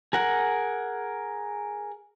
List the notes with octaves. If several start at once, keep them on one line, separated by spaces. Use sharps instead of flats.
G#4 A#4 F#5